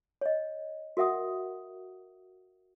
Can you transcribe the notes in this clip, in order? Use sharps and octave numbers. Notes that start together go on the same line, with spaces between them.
C#5 D#5
F#4 A#4 E5 F#5 D#6